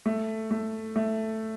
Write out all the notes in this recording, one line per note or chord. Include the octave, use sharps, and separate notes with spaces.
A3
A3
A3